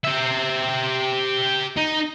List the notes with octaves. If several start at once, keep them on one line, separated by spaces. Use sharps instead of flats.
G4 E5
D#4